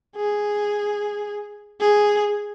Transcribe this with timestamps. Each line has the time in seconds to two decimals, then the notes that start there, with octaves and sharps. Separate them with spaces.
0.16 G#4
1.81 G#4